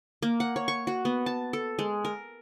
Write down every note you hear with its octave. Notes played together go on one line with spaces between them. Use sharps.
A#3
F#5
C#5
C#6
F#4
B3
A5
A4
G#3
A#4